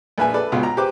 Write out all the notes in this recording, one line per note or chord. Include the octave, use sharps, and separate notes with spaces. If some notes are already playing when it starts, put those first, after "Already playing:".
A#1 B4 E5 G#5
A4 B4 D5
C#2 B2 F4
A#5
G4 B4 C5 D6